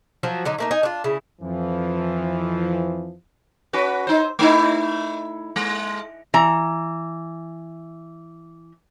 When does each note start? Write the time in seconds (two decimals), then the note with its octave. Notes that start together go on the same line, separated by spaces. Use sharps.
0.23 F3 F#3 F#4
0.45 D3 F#3 D#4
0.58 A3 A#3 D#4
0.71 D#4 D#5 G#5
0.83 D4 F4
1.04 C#3 E4
1.41 F2 E3 F3
3.73 C#4 F#4 B4
4.07 D#4 C5
4.39 A3 D#4 E4
5.56 G#3
6.34 E3 A#5